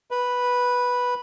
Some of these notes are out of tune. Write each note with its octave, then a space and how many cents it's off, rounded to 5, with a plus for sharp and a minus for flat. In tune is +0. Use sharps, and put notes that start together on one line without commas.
B4 -5